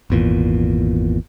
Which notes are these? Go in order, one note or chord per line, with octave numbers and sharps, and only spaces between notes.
G#1 E2 A#2